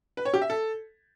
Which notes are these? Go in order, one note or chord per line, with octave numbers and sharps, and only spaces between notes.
B4
C#5
G4
E5
A4